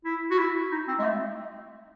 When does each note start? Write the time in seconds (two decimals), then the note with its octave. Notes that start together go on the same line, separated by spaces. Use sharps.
0.05 E4
0.31 F#4
0.38 E4
0.72 D#4
0.88 C4
0.99 G#3
1.04 A3